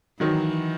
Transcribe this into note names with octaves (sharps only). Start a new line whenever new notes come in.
D#3 E3 F#3